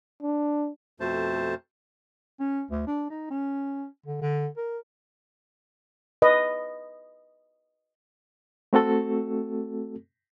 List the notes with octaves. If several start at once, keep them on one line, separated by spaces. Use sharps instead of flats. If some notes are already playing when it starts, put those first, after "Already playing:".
D4
F2 B2 A3 C5 A5
C#4
D2
D4
D#4
C#4
D3
D3
A#4
B4 D#5
A3 C4 F#4 A4